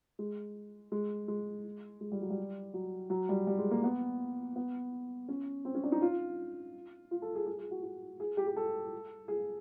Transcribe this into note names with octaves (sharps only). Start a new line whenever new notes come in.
G#3
G#3
G#3
G#3
G3
F#3
G3
F#3
F#3
G3
G3
G#3
A#3
B3
B3
C#4
C4
C#4
D4
D#4
F4
F4
A4
G#4
G#4
G#4
F#4
F#4
G#4
G4
G4
A4
G#4